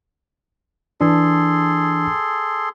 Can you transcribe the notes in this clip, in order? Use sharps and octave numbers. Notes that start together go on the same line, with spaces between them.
E3 D4 G#4 A4 C6